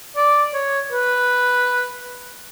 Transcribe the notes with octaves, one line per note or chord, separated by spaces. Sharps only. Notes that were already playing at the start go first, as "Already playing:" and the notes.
D5
C#5
B4